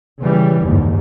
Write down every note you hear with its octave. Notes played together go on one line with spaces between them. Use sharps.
C#3 E3 G3
F#1 D#2 G#2